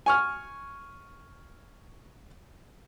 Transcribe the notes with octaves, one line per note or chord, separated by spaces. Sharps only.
G#5 C#6 F6